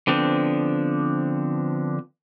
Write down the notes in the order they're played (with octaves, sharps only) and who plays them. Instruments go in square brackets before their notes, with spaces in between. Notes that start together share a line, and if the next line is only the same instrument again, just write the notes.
[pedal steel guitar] D3 F3 B3 C4 D4